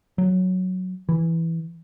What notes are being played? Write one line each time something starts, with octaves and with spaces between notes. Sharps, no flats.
F#3
E3